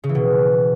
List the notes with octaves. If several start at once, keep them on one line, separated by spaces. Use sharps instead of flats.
C#3
E3
B2